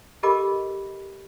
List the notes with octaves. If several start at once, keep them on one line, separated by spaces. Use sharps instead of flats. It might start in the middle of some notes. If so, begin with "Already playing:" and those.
G4 A4 A#4 D#5 B5 D6